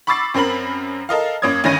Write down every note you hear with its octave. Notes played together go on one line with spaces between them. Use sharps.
B5 C#6 D6 E6 A6 C7
F#2 C4 A#4 B5 F#7
A4 A#4 D#5 F5
F#2 A#3 C#5 D#6 G#6
D2 G2 D#3 C#4 A#6 D#7